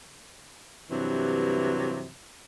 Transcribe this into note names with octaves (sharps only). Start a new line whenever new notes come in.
G2 C3 E3 F#3